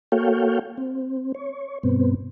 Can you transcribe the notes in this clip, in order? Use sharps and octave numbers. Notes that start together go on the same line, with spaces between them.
A#3 F#4 A4 C#5 F5 G5
C4
C#5
G2 B2 B3 C4